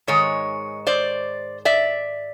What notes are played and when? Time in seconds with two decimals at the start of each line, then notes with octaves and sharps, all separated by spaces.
0.07 G#2 D#3 G#3 C#5
0.87 C5 D5
1.65 D5 E5